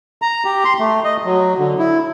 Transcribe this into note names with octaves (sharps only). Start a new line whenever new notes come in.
A#5
G4
C6
A3
D#5
F#3
D3
E4